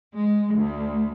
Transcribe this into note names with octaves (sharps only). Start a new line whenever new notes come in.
G#3
D2